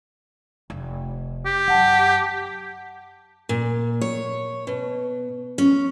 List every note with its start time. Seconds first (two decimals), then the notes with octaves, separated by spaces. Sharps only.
0.70 F1
1.45 G4
1.68 F#2 F#5 A5
3.49 A#2
4.01 C#5
4.67 B2
5.58 C#4